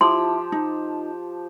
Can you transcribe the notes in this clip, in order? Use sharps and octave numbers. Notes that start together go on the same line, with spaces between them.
F3 E4 G4 C6
D#4